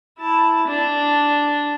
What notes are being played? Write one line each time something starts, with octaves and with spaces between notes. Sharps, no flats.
E4 A5
D4